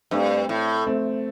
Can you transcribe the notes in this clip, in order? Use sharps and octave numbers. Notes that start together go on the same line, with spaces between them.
G2 A3 C4
A2
A3 C4